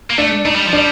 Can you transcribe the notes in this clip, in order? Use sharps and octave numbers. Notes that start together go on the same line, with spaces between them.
A#3
A3 D4
A3 D#4
G3
F3
G3 D4